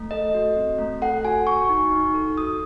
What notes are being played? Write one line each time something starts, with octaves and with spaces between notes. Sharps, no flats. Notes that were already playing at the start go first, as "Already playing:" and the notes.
Already playing: A3
A4 D#5
F#4
C4
A3
A4 F#5
F#4 G#5
F#4 C#6
D#4
D#4
A4
F#4 D#6